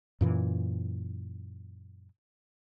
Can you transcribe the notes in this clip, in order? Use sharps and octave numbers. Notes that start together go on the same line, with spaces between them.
F#2 A#2 E3